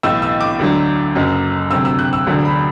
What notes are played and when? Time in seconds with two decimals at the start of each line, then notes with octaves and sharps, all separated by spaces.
0.03 B1 A2 E3 E6
0.22 E6
0.40 D6
0.59 D2 D3 F#3
1.15 F#1 F#2 F#3
1.71 D2 C3 F#3 E6
1.85 E6
1.99 F#6
2.13 E6
2.27 E1 D2 D3 F#3
2.45 B5